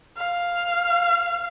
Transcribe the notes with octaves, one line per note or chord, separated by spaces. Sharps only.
F5